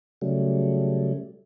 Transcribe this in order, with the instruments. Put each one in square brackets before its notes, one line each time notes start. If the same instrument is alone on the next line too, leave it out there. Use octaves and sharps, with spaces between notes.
[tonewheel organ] C#3 F#3 G3 A3